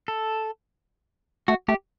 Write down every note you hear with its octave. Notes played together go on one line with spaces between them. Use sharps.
A4
A3 F#4
A3 G4